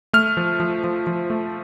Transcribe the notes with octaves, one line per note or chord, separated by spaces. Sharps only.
A3 F6
F3
F3
F3
F3
A3